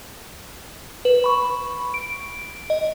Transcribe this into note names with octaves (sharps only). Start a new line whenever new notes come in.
B4
B5 C#6
D7
D#5